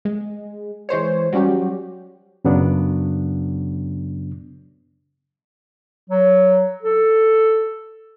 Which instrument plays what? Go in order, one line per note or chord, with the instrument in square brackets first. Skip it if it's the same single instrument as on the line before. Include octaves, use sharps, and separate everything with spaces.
[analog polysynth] G#3
E3 G#3 C5 C#5
F#3 G3 C#4 F#4 G4
[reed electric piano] F#2 C#3 F#3 B3 D4
[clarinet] F#3
A4